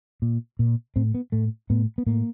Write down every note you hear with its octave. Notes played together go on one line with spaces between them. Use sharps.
A#2
A#2
A2 C4
B3
A2 A3
A2 B3
B3
A2 A#3